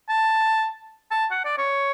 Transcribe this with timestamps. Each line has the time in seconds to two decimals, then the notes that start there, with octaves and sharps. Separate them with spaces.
0.09 A5
1.11 A5
1.31 F#5
1.45 D5
1.58 C#5